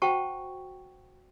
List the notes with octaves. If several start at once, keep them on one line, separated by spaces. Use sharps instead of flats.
F#4 C5 F#5 G5 A5 C#6